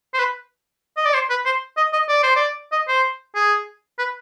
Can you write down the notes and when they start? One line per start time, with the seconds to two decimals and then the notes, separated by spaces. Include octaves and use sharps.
0.14 C5
0.19 B4
0.97 D#5
1.06 D5
1.14 C5
1.30 B4
1.46 C5
1.77 D#5
1.93 D#5
2.09 D5
2.23 C5
2.36 D5
2.72 D#5
2.88 C5
3.35 G#4
3.99 B4